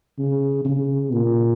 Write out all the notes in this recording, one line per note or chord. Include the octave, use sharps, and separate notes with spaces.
C#3
C#3
A#2